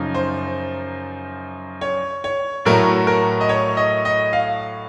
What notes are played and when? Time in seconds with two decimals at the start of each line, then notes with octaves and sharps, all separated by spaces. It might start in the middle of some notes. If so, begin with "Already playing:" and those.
Already playing: F#2 C#3 F3 D#4
0.15 C5
1.81 C#5
2.24 C#5
2.65 A2 F#3 A3 A#4
3.07 A#4
3.41 D#5
3.49 C#5
3.77 D#5
4.05 D#5
4.33 F5